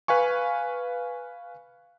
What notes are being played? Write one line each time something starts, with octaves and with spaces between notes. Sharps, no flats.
B4 F5 G#5 C#6